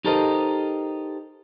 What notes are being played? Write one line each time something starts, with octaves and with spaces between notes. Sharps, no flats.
D#4 G4 A4 A#4 C5 D#5